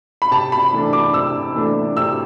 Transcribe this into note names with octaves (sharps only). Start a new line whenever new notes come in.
B5
C3 A5
B5
E3 A3 D4
D6
C3 E6
E3 A3 D4
C3 E6